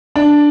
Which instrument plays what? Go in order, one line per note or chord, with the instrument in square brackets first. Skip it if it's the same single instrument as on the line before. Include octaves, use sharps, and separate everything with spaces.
[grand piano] D4